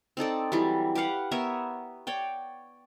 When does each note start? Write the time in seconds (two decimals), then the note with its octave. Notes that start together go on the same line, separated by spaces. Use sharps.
0.17 C4 D#4 A4 D5
0.52 E3 F#3 G3
0.95 G4 B4 F5 F#5
1.31 B3 A#4 C#5 E5
2.07 C#5 D5 G5